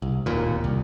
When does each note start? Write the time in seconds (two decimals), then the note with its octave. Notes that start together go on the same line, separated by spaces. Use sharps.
0.02 C2
0.26 D1 D#2 A#2
0.64 C2